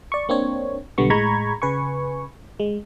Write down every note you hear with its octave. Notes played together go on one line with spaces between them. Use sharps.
D5 C#6
A#3 C4 D4 C#5
B1 D3 G3 B3 C#6
A2 G#3 A#5 B5 C#6 G#6
C#3 B4 G#5 C#6
G#3